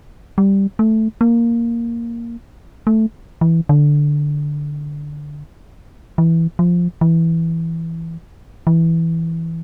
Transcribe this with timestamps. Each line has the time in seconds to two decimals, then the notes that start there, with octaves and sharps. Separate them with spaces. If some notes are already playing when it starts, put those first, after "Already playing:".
0.38 G3
0.79 A3
1.21 A#3
2.87 A3
3.41 E3
3.69 D3
6.18 E3
6.59 F3
7.01 E3
8.67 E3